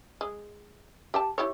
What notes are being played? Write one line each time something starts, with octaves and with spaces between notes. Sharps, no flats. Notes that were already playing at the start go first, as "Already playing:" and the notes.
G#3
G4 G5 A5
E4 G4 C#5